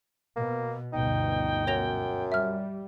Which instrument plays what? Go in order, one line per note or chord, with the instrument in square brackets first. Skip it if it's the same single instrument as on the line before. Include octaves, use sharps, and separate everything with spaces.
[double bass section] B2 [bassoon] A#3
[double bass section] G1 D2 B2 [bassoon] D#4 [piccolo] G5
[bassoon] F#2 [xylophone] C#5 A#6 F7
[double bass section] G3 [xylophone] E5 F6